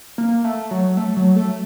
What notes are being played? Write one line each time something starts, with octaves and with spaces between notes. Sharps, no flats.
A#3
A3
F#3
A3
F#3
A3